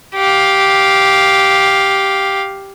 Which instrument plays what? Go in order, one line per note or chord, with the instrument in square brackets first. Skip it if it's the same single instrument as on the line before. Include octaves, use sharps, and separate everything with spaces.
[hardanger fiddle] G4 F5